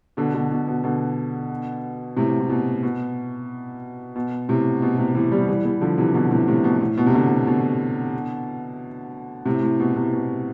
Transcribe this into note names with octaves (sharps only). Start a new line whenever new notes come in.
B2 D3
B2 D3
B2
B2
B2 D3
A2 C3
A2
B2
B2
B2
A2 C3
B2
A2 C3
C3 E3
E3 G3
E3 G3
E3 G3
D3 F3
C3 E3
B2 D3
A2 C3
A2 C3
B2
B2
A2
B2
C3
B2 D3
B2
B2 D3
A2 C3
A2
B2
A2 C3
B2